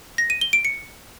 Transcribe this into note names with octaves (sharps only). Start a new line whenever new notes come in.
A#6
D#7
G7
D7
C#7